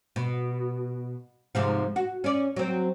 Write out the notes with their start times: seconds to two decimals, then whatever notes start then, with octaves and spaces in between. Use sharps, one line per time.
0.16 B2
1.55 G#2 C3 F3
1.96 F#4
2.24 C#4 D5
2.56 F#3 C4